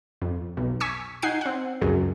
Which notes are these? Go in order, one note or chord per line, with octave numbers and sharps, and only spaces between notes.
F2
B1
G#5 C#6 E6 B6
D#4 F#5 G#5 G6 C7
C4 F#5
C#2 F#2 G#4